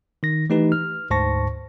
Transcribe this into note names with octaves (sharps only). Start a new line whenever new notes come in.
D#3 A#6
E3 A3 D#4 G4 B4
F6
D2 G#2 C5 A5 C#6 A#6